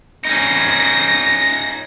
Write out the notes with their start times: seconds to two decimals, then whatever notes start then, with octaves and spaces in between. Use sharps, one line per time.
0.25 C#4 D#4 A#6